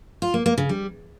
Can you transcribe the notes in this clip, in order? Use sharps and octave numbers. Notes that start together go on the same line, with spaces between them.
F4
A#3
A#3
C#3
G3